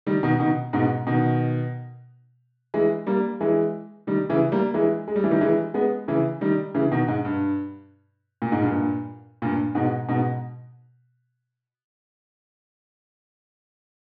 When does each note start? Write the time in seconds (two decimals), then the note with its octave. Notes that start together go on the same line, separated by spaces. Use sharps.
0.06 D#3 G3
0.23 B2 D#3
0.40 B2 D#3
0.73 G#2 B2
1.07 B2 D#3
2.74 E3 G#3
3.07 G3 A#3
3.41 E3 G#3
4.07 D#3 G3
4.29 C#3 E3
4.52 G3 A#3
4.74 E3 G#3
5.08 G#3
5.16 G3
5.24 E3
5.31 D#3 G3
5.41 E3 G#3
5.74 G#3 B3
6.08 C#3 E3
6.41 D#3 G3
6.75 C#3 E3
6.92 B2 D#3
7.08 G#2
7.25 G2
8.42 A#2
8.52 G#2
8.62 G2 A#2
9.42 G2 A#2
9.75 G#2 B2
10.09 G#2 B2